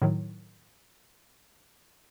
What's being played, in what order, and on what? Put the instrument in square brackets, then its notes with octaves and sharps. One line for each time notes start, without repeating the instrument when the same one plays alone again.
[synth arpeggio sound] A2 D#3 F#3